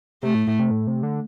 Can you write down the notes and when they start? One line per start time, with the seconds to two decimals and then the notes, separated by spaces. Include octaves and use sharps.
0.23 C3 A3
0.35 A2
0.47 A2
0.59 C3
0.71 A2
0.87 C3
1.03 D3